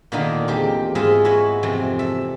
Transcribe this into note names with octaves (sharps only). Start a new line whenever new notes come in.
A#2 D3 D#3 A#3 B3 D#4
E2 C4 G4
G#2 G#3 F4 D#5 E5 B5
E4 F#4 B4 C#5
F2 C3 E3
A4 E5